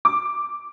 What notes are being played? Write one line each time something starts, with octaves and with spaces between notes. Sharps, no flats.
D6